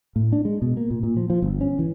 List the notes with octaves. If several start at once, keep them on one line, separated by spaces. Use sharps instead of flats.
A2
D4
G#3
B2
A#3
A#2
A#2
F3
F3
G1
C#4
E3